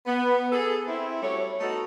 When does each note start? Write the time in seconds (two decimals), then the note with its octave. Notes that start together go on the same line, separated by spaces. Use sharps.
0.05 B3
0.52 G#4 A4
0.87 C4 E4
1.21 G3 A3 F#4 C#5
1.60 A3 B3 D#4 F#4 A4